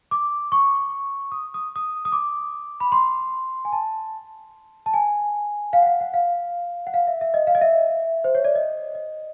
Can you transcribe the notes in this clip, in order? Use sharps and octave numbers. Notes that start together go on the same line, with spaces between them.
D6
C#6
D#6
D#6
D#6
D#6
D6
B5
C6
G#5
A5
A5
G#5
F5
F#5
F5
F#5
F5
F#5
F5
E5
E5
D#5
F5
D#5
E5
C5
C#5
D5
D#5
D#5